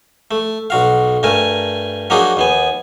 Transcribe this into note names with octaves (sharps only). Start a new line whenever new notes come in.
A3
B1 F#4 F5
G2 A3 A#4 G#5
F#3 A#3 D4 D#4 F#4 G#4
D#2 B3 G#5